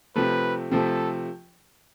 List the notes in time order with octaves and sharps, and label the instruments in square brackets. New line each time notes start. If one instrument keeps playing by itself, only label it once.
[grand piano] C3 F3 A3 [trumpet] B4
[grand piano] C3 F3 A3 [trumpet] A4